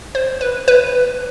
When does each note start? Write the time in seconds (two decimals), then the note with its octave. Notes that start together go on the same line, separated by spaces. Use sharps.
0.15 C5
0.41 B4
0.68 B4